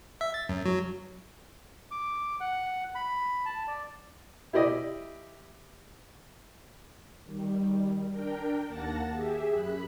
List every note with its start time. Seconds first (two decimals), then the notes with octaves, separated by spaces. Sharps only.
0.21 E5
0.34 A6
0.49 F#2
0.65 F#3
1.91 D6
2.40 F#5
2.95 B5
3.45 A5
3.67 D5
4.53 E4 G4 D5 D#5
7.25 D#3 G3
8.10 D4 A#4 G5
8.67 D#2 A#3 F#5 A5 A6 A#6
9.12 G4 G#4 E5
9.52 F#2 B5 F#6